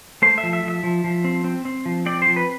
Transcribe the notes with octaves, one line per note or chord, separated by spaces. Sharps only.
A3 C5
E5
F3
E5
F3 E5
F3
F3
C4
C4
C4
F3
C4 D5
F3 C5
B4